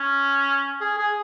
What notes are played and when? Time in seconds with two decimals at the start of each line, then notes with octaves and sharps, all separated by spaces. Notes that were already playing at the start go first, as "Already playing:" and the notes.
Already playing: C#4
0.81 G#4
0.98 G#4